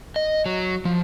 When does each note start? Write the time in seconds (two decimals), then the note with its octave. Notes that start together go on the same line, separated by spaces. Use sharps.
0.16 D#5
0.46 F#3
0.85 F3